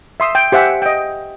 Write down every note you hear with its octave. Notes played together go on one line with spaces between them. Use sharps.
E5 C6 D#6 E6
G5
G4 C5 E5 F#5 G#5
D#5 G5